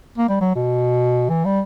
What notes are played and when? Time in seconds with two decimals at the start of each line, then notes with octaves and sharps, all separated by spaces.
0.18 A#3
0.29 G3
0.41 F#3
0.56 B2
1.30 E3
1.45 G3